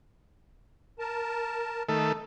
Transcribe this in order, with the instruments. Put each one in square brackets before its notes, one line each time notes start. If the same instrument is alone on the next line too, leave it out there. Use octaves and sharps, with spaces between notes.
[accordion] A#4 A5
[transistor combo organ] D#3 A3 A4